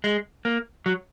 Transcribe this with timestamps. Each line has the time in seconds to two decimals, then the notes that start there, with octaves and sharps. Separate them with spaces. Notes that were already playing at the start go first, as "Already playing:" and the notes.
0.04 G#3
0.45 A#3
0.86 F#3